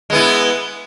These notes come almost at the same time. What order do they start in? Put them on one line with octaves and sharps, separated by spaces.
G#3 B3 E4